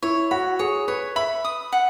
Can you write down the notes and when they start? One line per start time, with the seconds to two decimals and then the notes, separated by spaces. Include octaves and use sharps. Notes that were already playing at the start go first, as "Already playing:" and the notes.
0.03 E4 C#5
0.31 F#4 B5
0.59 G#4 C#5
0.88 B4 C#5
1.16 E5 B5
1.45 D#6
1.72 F#5